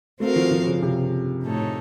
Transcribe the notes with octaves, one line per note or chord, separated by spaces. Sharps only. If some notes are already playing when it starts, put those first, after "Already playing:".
A3 C4 F#4 A#4 F5
F3
F3
C#3
C3
A2 A3 D#4 A4 C#5